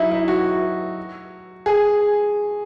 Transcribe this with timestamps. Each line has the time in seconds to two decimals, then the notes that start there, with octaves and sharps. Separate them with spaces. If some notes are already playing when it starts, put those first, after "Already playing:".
Already playing: F#3 D#4 E4
0.11 E4
0.28 F#4
1.66 G#4